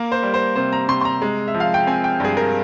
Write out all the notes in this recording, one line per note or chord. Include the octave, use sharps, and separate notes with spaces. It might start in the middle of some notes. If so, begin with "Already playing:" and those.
Already playing: A#3 A#4
C5
G3
C5
C3 C5
A#5
C3 C6
C6
A#5
G#3
E5
F3
F5
G5
C4 G#5
G5
G2 G#4
A#4